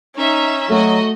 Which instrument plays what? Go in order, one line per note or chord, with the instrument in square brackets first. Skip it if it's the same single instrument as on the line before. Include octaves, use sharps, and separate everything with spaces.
[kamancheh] C#4 [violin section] D#4 E5
[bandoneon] F#3 [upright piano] A3 [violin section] F#4 D#5